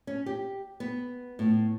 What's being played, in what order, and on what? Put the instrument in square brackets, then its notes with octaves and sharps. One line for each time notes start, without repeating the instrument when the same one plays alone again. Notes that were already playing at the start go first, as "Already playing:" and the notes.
[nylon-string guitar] C#4
G4
B3
A2